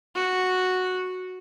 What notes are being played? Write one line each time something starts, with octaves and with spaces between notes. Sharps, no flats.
F#4